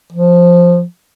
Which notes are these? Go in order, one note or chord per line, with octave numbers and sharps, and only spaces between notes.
F3